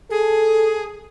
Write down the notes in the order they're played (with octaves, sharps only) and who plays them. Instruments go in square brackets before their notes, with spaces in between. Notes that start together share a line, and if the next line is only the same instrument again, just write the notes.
[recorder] G#4 [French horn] A4